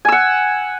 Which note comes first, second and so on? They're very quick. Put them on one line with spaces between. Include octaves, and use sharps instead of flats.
G#5 E6 F#5